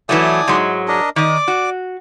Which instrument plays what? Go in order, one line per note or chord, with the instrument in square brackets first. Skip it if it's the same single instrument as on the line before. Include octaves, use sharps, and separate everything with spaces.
[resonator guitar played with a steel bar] E3 F#3 A3 [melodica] D5 G#5 D#6
[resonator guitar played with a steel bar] G#2 F#3 G#3
[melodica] D4 A#4 D#5
[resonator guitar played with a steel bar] D#3 D#5 [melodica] D5 D6
[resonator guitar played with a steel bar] F#4